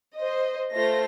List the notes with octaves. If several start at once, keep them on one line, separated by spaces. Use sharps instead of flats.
C5 D#5
A3 F4 C5 A#6